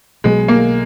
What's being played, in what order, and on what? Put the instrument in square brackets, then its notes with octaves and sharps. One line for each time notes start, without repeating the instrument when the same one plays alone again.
[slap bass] B1 B2 F#3 B3 [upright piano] G#3
[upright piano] A#3